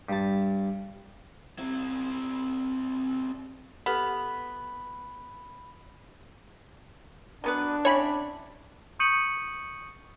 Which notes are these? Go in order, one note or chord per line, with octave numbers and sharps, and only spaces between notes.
G2 A5
C4 E4
B3 G4 A4 B5 F6
F#3 B3 D4 B4
C4 C#4 E4 C#5 B5
C#6 D#6 G6 C#7 D#7 F#7